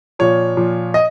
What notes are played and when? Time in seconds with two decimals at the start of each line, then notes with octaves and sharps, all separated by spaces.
0.19 A#2 F3 C#5
0.57 A#2 F3
0.94 D#5